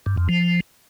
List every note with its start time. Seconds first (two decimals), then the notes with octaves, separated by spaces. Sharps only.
0.06 G2
0.17 F2
0.29 F3